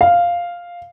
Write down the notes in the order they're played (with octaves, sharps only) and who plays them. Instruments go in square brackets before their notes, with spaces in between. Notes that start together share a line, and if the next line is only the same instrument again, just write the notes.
[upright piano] F5